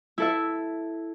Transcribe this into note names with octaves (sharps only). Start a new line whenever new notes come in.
E4 A4 E5